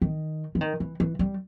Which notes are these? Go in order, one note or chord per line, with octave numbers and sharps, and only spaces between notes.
D#3
E3
D#3
E3
E3
G3